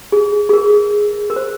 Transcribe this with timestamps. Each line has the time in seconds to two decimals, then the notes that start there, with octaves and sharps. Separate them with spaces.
0.12 G#4
0.49 G#4
0.53 A#4
1.30 A#4
1.36 C5